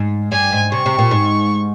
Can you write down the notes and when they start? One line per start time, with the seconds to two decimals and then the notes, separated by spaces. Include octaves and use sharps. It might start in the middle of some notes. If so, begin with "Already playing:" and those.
Already playing: G#2
0.32 G2 G#5
0.52 G#2
0.72 C3 C#6
0.86 C3
0.99 A#2
1.11 G#2